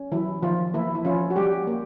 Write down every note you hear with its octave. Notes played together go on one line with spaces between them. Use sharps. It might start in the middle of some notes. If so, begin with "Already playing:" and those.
Already playing: C#4
E3 F#3 E4
D#3 F3 F4
E3 A#3 E4
E4
F3 C#4 F4
F#4
G3 G4
A#3